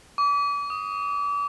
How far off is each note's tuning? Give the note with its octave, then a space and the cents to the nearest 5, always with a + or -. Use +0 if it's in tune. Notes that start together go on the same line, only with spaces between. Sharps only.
D6 -40
D#6 +5